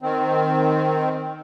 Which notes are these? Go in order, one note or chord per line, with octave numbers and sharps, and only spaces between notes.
D#3 C4